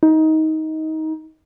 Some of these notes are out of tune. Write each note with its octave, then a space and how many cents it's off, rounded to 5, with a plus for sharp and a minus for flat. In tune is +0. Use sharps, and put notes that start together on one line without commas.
D#4 +20